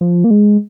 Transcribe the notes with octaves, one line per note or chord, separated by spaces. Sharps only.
F3
A#3
G#3